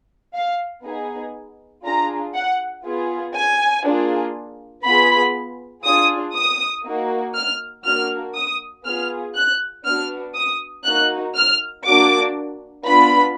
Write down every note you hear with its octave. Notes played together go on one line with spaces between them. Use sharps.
F5
B3 D#4 G#4
D4 F4 G#4 A#5
F#5
B3 F4 G#4
G#5
A#3 D4 F4 G#4
B3 F4 G#4 B5
D4 F4 G#4 D#6
D#6
A#3 D#4 F#4
F6
A#3 D4 F#4 F6
D#6
B3 F4 G#4 F6
F#6
B3 D4 F#4 F6
D#6
A#3 D#4 F#4 F#6
F6
A#3 D4 F#4 D6
B3 D4 F4 B5